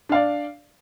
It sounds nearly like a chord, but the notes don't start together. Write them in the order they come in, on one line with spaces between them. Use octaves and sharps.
D4 F5 D5